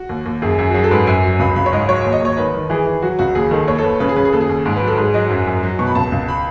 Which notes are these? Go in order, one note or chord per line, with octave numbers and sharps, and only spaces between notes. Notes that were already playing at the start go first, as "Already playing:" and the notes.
Already playing: F#4
D#2
D#2
F#2 G#4
F#2
F#4
F#3 G#4
A4
G#2 B4
F#2 G#5
F#3
C#2 B5
C#2 B5
C#5
G#2 D#5
F#3 C#5
D#2
D#5
D#2 C#5
D#3 B4
D#3
E3 G#4
E3
F#3 F#4
C#2 F#4
D#2 G#4
D#3 A4
D#2 C#5
A4
D#2 B4
C#3 B4
G#4
C#3 B4
G#4
D#2 A4
G#4
D#2
G#2
B4
F#3
A4
G#2 G#4
F#3 D#5
F#2
F#2
F#3
B2 C#6
B5
C#2 A5
C#2
B5